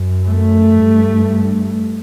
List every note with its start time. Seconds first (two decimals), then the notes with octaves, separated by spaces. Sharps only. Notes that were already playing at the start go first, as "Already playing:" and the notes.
Already playing: F#2
0.27 A3
0.80 G2